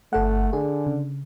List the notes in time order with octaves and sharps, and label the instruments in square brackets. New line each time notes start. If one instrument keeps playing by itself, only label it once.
[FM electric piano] G1 A4 F#5 [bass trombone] A3
[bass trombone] D3 [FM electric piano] G#4
[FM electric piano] C#3